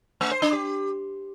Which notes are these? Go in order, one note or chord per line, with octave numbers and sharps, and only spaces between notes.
A3
C5
D4
G4